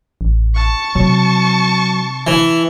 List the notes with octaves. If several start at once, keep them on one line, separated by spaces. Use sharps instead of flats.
A1
A5 C#6
C3 F#3
E3